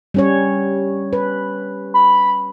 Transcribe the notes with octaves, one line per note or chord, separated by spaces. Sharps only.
G3 C#4 C#5
B4
B5